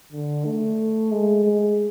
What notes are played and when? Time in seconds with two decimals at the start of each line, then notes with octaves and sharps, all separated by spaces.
0.12 D3
0.46 A3
1.12 G#3
1.44 G#3